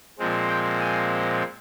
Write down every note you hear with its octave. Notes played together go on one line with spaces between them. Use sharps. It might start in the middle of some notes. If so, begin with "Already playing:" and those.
A#2 F3 G#3 C4
G5
G#5